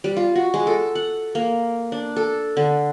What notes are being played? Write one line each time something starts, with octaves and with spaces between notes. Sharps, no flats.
G3
F4
F#4
G#3
A4
F#5
A#3
D4
A4
D3